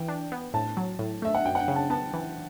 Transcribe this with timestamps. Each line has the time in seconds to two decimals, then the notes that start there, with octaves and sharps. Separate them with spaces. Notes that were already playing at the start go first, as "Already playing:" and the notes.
Already playing: E3 G5
0.08 D4
0.32 B3
0.54 A2 A5
0.77 F#3
0.99 A2
1.22 A3 E5
1.35 F#5
1.45 F#2 G5
1.55 F#5
1.60 G5
1.68 C#3
1.76 A5
1.90 B3 A5
2.13 E3